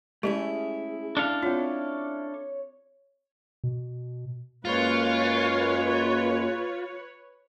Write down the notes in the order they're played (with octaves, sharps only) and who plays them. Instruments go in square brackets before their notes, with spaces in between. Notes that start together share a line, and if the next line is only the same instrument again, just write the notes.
[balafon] G#3 G4 [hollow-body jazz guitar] A3 C#4 E4 [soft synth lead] G#4
[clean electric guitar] D4 A4 F5
[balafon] C4 F4 [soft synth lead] C#5
[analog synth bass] B2
[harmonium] F#2 G#3 A#3 [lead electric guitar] F4 [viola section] B4 C#5